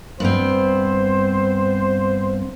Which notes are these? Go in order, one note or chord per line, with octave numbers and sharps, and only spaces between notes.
G2 B3 C4 C5